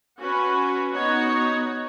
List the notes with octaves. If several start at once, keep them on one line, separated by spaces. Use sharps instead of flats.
C#4 F#4 B4
B3 D#4 F#4 C#5